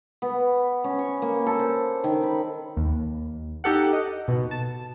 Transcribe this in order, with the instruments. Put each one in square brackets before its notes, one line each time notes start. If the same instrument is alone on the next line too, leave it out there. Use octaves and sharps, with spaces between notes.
[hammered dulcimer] B3
C#4
C#6
A#3
A4
C5
D#3
B5
[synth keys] D#2
D#4 G4 A4 F#5
D#5
B2
A5